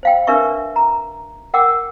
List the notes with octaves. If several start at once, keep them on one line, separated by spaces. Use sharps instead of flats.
C5 F5 G5
D4 A#4 B4 E5 C#6
A#5
A#4 F#5 G5 D6 E6